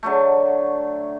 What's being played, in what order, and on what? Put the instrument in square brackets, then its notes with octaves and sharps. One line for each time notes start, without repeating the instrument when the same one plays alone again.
[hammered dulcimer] D3 F#3 A3